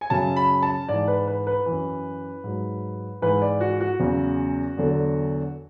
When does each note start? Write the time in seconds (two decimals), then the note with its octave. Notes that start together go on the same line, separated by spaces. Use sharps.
0.01 G#5
0.10 F#2 C#3 F#3 A5
0.36 B5
0.63 A5
0.89 G#2 E3 D5
1.08 B4
1.27 B4
1.47 B4
1.66 F#2 E3
2.44 G#2 F#3
3.22 G#2 E3 B4
3.42 D5
3.60 F#4
3.80 F#4
3.99 E2 C#3 F#3
4.77 E2 D3 F#3